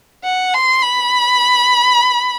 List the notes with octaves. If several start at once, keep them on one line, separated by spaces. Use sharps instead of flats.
F#5
C6
B5